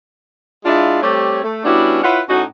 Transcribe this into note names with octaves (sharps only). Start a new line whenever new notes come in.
G#3 D4 E4 F4
G3 A3 C4 G4 C#5
A3
G3 B3 C#4 D4 E4 F#4
E4 F4 B4 C#5 F#5
A2 C#4 D#4 F#4